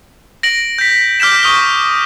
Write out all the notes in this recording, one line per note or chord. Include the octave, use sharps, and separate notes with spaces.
A#6 D7 F#7
G6 B6
D6 F6 G6 B6 E7
C#6 D#6 F6 G7